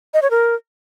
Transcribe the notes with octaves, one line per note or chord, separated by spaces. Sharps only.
D#5
C#5
A#4